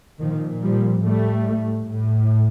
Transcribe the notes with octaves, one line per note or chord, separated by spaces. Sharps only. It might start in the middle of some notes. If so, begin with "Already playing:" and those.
A#2 D#3 F3
F3 G3
A2 G3 A3
A2